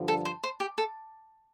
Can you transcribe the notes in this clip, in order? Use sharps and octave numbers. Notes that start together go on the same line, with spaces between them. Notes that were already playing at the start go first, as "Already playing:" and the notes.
Already playing: G2 D3 F3
A4
C5
C5
G4
A4